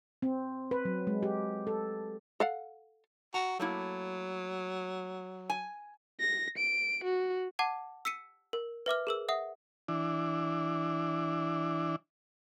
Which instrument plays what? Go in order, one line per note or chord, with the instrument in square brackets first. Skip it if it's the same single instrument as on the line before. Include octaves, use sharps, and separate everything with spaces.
[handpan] C4
B4
F#3
G#3
G4
A4
[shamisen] A4 F5 F#5
[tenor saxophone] F#4 [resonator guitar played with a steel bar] A#5
[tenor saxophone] F#3 [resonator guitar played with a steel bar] A3 A#3 E4
[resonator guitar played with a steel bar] G#5
[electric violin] A#6
D7
F#4
[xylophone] F#5 A5 D6 G#6
E6 B6 C#7 D#7
A#4
B4 E5 D6 F6
G#4 A#4 E6
E5 F#5 D#6
[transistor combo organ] E3 D4